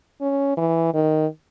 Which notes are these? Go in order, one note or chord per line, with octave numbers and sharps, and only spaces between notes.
C#4
E3
D#3